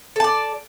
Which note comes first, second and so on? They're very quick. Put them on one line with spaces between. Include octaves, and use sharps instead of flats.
A4 A5 D5